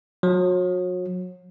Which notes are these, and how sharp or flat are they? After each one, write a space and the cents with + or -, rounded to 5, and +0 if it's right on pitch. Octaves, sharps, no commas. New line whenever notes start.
F#3 -35